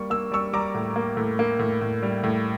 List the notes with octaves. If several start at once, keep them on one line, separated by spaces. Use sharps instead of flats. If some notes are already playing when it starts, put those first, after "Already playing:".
Already playing: G3 A#3 C#6
A#3 E6
G3 C#6 E6
G3 A#5 D6
A2
A#3
A2
A#3
A2
A2
G3
A2